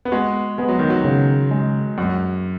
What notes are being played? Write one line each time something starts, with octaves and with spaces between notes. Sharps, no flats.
B3
G#3 F#4
G#3 B3
F#3
D#3
F#3
C#3
G#3
F#2 F#4